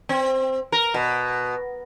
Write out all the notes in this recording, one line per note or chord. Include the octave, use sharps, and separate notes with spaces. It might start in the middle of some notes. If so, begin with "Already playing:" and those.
C4
A#4
B2